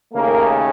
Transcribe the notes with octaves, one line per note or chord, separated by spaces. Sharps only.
D#2 C#3 A3 A#3 A#4